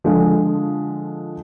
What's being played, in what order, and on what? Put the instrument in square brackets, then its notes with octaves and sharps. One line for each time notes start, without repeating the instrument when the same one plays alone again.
[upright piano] D3 F3 G#3